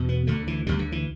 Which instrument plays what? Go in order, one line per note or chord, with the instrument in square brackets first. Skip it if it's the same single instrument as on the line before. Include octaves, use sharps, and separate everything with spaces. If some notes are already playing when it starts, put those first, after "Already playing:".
Already playing: [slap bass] E2 B2
B3
D2 D3 A3
E3
D2 D3 G3
D3
E3